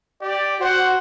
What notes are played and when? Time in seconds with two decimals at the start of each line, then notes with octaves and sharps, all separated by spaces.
0.21 G4 D5
0.60 F#4 C5 F#5